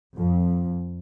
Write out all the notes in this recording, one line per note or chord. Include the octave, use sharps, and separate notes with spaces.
F2